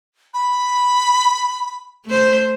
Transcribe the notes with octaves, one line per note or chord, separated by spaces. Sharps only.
B5
A3 C5